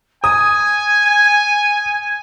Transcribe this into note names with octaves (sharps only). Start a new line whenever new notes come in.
G#5 D#6 G#6